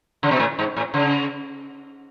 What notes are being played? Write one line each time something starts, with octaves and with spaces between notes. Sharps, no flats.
C#3
B2
A2
G#2
A2
C#3